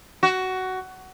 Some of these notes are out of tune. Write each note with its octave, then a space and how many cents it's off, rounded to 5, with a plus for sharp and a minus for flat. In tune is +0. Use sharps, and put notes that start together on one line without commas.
F#4 +15